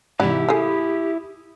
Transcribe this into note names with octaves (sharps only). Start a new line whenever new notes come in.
G#2 C3 E3 E4 G4 D5 F#5
A3 G#4 B5 D#6